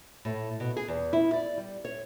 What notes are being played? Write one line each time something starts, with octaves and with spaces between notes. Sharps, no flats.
A2
B2
G#4
E2
E4
D5
G3
C#5